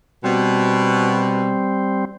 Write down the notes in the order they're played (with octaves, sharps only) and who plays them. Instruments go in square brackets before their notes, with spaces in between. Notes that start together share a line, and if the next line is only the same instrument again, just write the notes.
[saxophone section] B2 [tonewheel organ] G3 C4